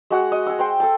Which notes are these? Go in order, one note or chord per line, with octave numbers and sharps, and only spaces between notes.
G#3 F#4 F#5
D#5
G#4 E6
C5 G5 C6
A4 A5